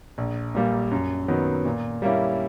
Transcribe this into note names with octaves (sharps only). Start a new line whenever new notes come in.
A#1
A#2 G3 A#3
F#2
D#3 F#3 B3
A#2
G3 A#3 C#4 E4